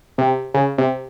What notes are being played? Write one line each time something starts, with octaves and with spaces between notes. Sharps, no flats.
C3
C#3
C3